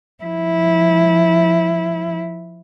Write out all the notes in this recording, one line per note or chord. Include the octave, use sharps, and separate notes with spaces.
F3 E4